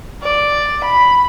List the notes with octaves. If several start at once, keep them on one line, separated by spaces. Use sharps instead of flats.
D5
B5